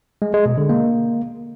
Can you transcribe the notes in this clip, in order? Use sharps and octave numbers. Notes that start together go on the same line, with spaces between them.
G#3
G#3
B2
D3
A#3